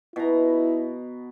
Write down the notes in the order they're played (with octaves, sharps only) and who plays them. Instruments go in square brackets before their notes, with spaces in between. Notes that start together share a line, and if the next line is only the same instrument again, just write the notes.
[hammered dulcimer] B2 A#5 [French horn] E4